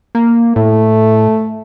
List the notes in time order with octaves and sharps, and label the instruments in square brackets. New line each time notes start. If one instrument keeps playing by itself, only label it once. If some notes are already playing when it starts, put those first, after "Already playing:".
[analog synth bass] A#3
[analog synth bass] A2 [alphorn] A3